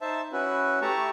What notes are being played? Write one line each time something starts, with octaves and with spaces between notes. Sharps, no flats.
D#4 C5 E5 A5
C#4 E4 F#4 B4
A3 E4 G4 A5 A#5 C#6